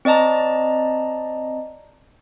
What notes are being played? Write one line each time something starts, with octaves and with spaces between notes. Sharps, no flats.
C4 D5 D#5 A5 A#5